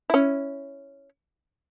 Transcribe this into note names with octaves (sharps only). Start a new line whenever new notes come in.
C#4 E4